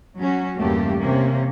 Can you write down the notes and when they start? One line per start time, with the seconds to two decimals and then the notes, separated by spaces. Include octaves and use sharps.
0.18 F#3 C#4 F#4
0.57 E2 G2 C#3 A3 A#3 G4
1.00 C3 A#3 C#4